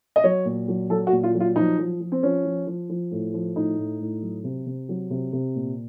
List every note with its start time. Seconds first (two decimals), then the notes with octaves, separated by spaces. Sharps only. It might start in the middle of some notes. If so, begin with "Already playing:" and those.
0.16 D#5
0.24 F#3 C#5
0.45 A#2
0.68 F#3
0.90 F#3 A4
1.07 F#4
1.12 A#2
1.23 F4
1.35 F#3
1.40 F4
1.56 F3 D#4
1.78 F3
2.00 F3
2.12 C4
2.23 F3 C#4
2.45 F3
2.67 F3
2.89 F3
3.11 A2
3.34 F3
3.56 A2 D#4
3.77 A2
4.00 A2
4.22 F#3
4.44 C3
4.66 C3
4.89 F#3
5.10 C3
5.32 C3
5.55 A#2